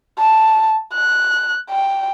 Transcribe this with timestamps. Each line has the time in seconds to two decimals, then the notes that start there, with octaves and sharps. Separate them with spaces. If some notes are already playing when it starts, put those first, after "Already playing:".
0.19 A5
0.95 F#6
1.70 G5